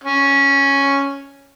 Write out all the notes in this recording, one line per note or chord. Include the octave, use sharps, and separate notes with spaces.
C#4